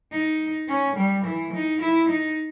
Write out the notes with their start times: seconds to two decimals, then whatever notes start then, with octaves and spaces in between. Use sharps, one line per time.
0.12 D#4
0.68 C#4
0.96 G3
1.25 E3
1.53 D#4
1.81 E4
2.09 D#4